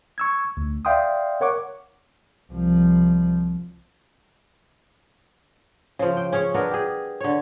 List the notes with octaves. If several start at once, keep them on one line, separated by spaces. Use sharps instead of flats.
C#6 E6 G#6
D2
D5 E5 F5 G5 C6 D#6
A#4 C#5 F#5 C#6 D6
C2 F3
C#3 F3
G5
C#4 G#4 C#5
B3 D4 A#4
G4 G#4
D3 C#5